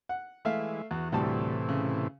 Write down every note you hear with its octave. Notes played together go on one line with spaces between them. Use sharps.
F#5
E3 G#3 A3 E5 F5
E2 F#4
D2 A2 C3 E3 G3 A5
C#3